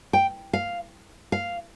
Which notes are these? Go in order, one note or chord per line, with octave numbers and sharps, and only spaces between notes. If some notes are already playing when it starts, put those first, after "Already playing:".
G5
F5
F5